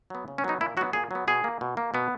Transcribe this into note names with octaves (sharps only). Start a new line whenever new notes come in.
F#3 B3
C#3
C#4
F#3 B3 D#4
A#2 E4
F#3 B3 F#4
A#2 G#4
F#3 B3
B2 G#4
A#3
B2
A#3
B2 B3